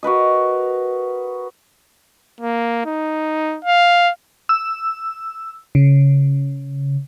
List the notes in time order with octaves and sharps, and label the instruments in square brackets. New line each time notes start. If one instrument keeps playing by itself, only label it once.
[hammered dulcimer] F#4 A#4 B4 D#5
[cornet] A#3
D#4
F5
[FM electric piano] E6
C#3